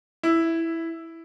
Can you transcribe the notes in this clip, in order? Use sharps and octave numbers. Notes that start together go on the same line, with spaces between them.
E4